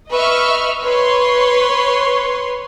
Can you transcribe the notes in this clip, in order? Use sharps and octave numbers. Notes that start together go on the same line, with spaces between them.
B4 D#5 E5 C#6 F6
B4 C#5 C6